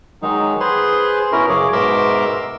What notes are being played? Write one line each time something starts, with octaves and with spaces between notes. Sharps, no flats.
D#3 F#3 G#3 D#4
G#4 B4 C5 C6
B2 C#4 E4 A#4
F#2 C#3 G#4 C#5 D6
G#2 B2 A#4 E5 C6 D6